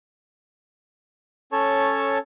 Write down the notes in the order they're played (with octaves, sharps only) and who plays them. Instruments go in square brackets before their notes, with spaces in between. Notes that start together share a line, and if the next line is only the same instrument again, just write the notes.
[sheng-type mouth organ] C#4 A4 C#5 A5 C#6